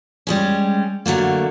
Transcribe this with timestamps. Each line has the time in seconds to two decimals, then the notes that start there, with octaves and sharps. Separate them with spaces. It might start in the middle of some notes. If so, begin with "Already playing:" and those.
0.27 G3 G#3 C#4
1.06 D3 F#3 A3 A#3